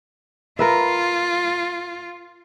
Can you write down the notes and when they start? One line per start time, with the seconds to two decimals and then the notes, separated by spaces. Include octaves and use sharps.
0.59 F4 A#4 B4 E5